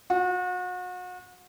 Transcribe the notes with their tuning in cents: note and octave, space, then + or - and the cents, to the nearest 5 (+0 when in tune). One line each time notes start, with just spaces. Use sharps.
F#4 -35